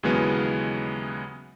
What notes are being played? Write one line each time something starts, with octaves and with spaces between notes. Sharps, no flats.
D#2 C#3 E3 F#3 G#3 B3